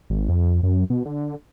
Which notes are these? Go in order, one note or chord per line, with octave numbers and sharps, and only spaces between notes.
G#1
F2
F#2
B2
D3